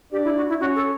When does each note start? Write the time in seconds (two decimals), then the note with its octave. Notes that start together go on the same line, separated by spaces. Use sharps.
0.12 D4 G4 D5
0.24 E4
0.37 F#4
0.49 E4
0.60 C#4 F#4 C#5
0.75 A4